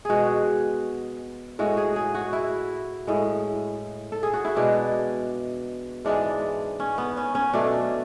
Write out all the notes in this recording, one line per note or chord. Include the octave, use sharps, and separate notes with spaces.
B2 G#3 F#4 G#4
A2 G#3 F#4
G#4
G#4
F#4
E4
A2 G#3
A4
G#4
F#4
E4
B2 G#3 D4
G#2 E3 G#3 D4
C#4
B3
C#4
C#4
B2 F#3 A3 D4